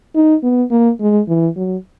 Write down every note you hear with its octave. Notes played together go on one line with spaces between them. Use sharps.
D#4
B3
A#3
G#3
E3
F#3